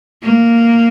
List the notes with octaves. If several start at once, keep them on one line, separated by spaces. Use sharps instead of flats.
A#3